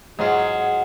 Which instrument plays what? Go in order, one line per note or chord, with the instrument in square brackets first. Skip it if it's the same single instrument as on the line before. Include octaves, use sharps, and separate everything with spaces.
[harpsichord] G#2 F4 [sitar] F#3 [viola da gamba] G#4